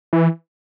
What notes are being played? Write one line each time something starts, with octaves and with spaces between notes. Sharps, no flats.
E3